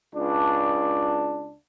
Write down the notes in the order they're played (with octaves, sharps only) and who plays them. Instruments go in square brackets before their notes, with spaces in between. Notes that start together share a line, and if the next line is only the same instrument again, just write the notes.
[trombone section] C#2 D4